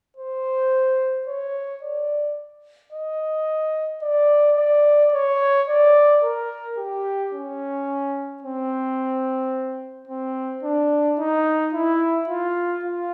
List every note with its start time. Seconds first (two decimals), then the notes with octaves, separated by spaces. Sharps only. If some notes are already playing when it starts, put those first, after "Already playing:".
0.17 C5
1.28 C#5
1.82 D5
2.93 D#5
4.02 D5
4.58 D5
5.13 C#5
5.68 D5
6.23 A#4
6.78 G4
7.33 C#4
8.43 C4
10.08 C4
10.63 D4
11.18 D#4
11.73 E4
12.28 F4
12.84 F4